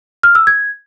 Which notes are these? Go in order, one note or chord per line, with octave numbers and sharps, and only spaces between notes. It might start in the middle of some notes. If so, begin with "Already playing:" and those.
F6
E6
G#6